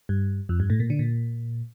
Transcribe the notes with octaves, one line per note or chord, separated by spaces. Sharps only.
G2
F2
G2
A2
A#2
D3
A#2